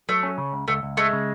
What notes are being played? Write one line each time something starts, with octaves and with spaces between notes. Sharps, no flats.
F#3 A3
C#4
C#3
C#2
C#2 A3
C#2
G#3 A3
C#3